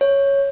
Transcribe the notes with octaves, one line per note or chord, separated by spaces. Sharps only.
C#5